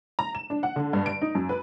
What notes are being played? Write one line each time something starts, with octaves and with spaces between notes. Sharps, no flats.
A#5
E7
D4
F#5
D3
G2
D7
D#4
F#2
B4